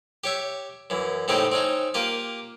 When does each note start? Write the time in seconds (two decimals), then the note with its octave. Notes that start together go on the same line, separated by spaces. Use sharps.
0.24 G4 C#5 E5
0.90 F#2 E3
1.28 A2 C#3 C4 D#4 G4
1.52 C4 C#4 D#4
1.94 A#3 F4 G4